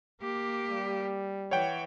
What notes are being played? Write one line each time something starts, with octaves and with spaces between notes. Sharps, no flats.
A#3 G4
G3
E3 C#5 F#5 G5